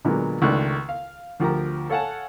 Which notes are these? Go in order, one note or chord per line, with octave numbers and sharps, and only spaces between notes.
A#2 D3 F#3 G#3 A#3 B3
C#2 D#3 A3 D4 F#6
F5
D2 F3 G4 A#4 A#5
A4 C#5 F5 F#5 G#5 A5